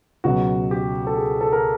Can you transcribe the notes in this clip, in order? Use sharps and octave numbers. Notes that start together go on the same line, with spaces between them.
C#2 B2 F#3 F#4
G4
A4
G#4
A4
A#4